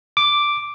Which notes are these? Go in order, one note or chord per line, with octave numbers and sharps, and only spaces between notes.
D6